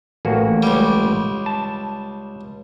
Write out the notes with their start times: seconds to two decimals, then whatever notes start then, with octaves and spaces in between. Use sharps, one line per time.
0.25 A1 A#3 F#4
0.63 C#2 G3
1.46 A5